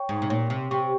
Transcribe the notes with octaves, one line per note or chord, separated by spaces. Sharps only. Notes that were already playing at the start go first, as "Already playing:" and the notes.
Already playing: C#5 G5 C#6
G#2
C3
A#2 C#5
C3
C3 G5 C#6